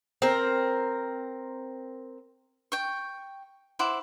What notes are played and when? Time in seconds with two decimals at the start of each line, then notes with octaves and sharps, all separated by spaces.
0.22 C4 A#4
2.72 G5 C#6
3.79 E4 C5 F#5 D6